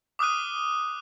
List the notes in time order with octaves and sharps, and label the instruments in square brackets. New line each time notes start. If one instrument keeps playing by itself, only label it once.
[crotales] D6 D#6 F6 F#6 D#7